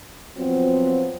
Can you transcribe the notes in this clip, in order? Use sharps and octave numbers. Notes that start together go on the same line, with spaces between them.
F3 F#3 B3 C4